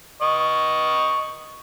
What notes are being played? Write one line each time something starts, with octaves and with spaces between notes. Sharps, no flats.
D#5 C#6